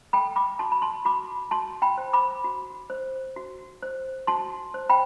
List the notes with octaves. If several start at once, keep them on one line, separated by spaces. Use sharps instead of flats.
A4 G5 B5
B5 D6
F#4 A5 C6
B5
A5 C6
F#4 B5 D6
F#4 A5 C6
G5 B5
C5
B5 D6
F#4
C5
F#4
C5
F#4 A5 C6
C5
G5 B5